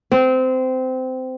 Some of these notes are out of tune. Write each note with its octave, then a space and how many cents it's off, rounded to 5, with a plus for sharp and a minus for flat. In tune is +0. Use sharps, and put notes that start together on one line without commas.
C4 -20